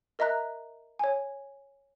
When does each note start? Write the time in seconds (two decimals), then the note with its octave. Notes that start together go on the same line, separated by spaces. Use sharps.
0.19 A#4 D#5 E5 A#5 F#6
0.99 C#5 G#5